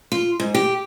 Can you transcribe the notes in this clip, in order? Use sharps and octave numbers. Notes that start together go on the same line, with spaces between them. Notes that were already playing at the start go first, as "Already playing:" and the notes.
F4
G#2
G4